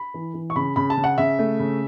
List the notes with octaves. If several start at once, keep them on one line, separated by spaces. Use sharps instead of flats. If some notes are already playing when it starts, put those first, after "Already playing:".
Already playing: B5
E3
E3
C#6
C#3 B5
C#3 B5
A5
C#3
F#5
C#3 E5
A3
C#3